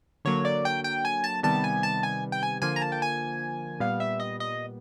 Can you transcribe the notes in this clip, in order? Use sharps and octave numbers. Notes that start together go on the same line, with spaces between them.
D3 F#3 A#3 C#5
D5
G5
G5
G#5
A5
C3 D#3 G3 B3 A5
G#5
A5
G#5
G5
G#5
D3 F3 A#3 G#5
A#5
A5
G5
G#5
A#2 G3 B3 F5
E5
D#5
D#5